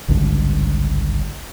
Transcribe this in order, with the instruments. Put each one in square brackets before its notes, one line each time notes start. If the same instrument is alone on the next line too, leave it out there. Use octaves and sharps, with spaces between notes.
[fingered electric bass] G#1 C#2 G2 D3